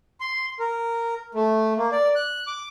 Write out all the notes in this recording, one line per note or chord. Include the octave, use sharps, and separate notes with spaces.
C6
A#4
A3
A#3
D5
F#6
D6